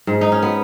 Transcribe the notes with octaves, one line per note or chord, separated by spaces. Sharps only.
G#2
D#4
C#4
B3